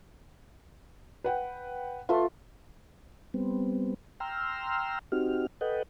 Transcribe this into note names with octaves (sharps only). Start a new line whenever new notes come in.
B4 F#5 G5
A3 F4 B4
G3 B3 C4
G5 A#5 C6 E6 F6
C4 D#4 F#4 G4 F6
A4 B4 D#5 F#5 G5